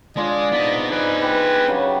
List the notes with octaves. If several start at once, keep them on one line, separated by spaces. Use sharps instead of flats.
G#3 D4 F4 D5
G#2 B3 C4 D#4 D#5
G#4 B4 D5
G4 B4
C#3 F#3 G4